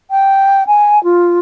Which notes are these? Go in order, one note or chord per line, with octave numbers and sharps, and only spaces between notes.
G5
G#5
F4